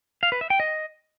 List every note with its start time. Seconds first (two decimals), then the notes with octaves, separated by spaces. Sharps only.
0.23 F5
0.32 B4
0.41 E5
0.50 G5
0.60 D#5